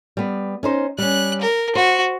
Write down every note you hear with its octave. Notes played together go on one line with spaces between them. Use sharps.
G3 B3
C#4 D#4 C5
G3 C#4 F#6
A#4
F#4 C5